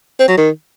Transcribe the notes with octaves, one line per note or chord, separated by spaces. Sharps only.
C4
F#3
D#3